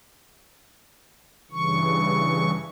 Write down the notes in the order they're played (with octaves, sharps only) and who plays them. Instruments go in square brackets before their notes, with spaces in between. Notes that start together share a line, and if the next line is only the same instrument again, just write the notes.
[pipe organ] G2 C#3 E3 C#6